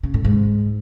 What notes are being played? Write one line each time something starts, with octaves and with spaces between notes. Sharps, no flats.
C#3
A2
G#2